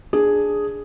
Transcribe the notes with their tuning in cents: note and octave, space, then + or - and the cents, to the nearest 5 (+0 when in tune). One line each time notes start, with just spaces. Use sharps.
D4 +0 G#4 +0